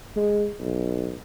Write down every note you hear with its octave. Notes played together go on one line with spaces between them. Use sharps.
G#3
B1